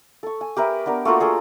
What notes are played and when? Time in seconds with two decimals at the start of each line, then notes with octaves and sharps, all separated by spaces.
0.23 A4 C#6
0.41 G#5
0.57 G4 A#4 B4 E5
0.86 B3 D4 A#4
1.05 A3 A#3 F4 F#4
1.20 G#4 A4 G5 A#5